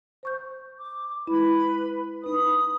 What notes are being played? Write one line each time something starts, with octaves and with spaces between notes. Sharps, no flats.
C5 C#6 G6
D6
G#3 E4 B4 B5
D#4 B4 B5 D#6